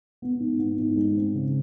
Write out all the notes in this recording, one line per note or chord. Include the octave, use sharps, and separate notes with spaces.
B3
G#2
B3
G#2
G#3
C4
C#3